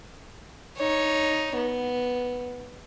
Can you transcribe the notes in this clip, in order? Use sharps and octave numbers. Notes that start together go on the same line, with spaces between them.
D#4 C#5
B3